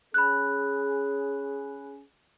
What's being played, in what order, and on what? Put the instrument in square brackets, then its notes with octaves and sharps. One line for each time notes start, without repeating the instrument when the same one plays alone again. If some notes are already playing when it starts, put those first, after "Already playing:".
[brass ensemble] C#4 G#4 [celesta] B5 F#6